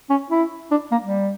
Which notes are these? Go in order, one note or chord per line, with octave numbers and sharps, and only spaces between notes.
C#4
E4
D4
A#3
G3